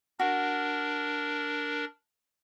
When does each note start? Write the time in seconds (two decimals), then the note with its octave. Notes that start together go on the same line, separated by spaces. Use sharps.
0.19 D4 F#4 A#4